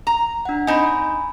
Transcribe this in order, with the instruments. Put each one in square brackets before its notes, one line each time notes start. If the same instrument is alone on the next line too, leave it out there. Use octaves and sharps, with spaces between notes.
[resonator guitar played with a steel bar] A#5
[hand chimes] D4 F#5
[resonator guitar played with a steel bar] C4 D#4 [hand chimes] G#5 A#5 B5